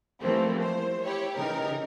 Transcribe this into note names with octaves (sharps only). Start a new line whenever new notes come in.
E3 F3 G3 A3 A#3 C4
C5
E4 G4 C#5
C#3 E3 D#4 A#4